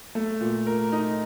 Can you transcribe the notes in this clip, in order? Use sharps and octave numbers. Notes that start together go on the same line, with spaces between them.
A3
A#2
A#4
D#4